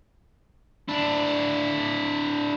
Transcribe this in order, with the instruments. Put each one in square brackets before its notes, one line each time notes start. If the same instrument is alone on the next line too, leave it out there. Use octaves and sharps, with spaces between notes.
[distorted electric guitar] D4 E4